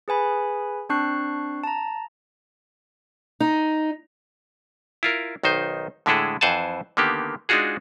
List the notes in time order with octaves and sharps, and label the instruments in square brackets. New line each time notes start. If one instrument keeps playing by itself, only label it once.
[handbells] G#4 B4 G#5 B5
C4 D4 A5 C#6 F#6 C7
A5 A#5
[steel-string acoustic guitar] D#4
[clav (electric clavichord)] E4 F4 A#4
B1 D#3 D#4 C5
A2 D3 G#3 E4 G#4 A4
F2 E3 C5 F#5 G#5 A5
D3 D#3 A#3 B3 G4
G#3 D4 D#4 F4 F#4 G#4